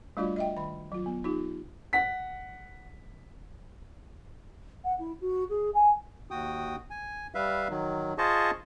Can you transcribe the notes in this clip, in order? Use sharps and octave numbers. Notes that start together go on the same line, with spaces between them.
G3 A3 D4 F4 F#4 D5
D#5 E5 G5
D#3 B5
F#3 F4
B3
D#4 F4 G4
F#5 B6
F#5
E4
F#4
G#4
G#5
D#2 F#4 G5 D#6
G#5
G3 B4 E5 F5
D#3 F#3
F4 G#4 C5 D#5 A5 C#6